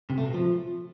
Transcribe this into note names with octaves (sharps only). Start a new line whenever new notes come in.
C3
A3
B2
F3